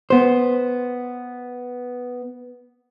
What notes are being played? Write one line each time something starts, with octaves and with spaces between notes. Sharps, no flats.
B3 C5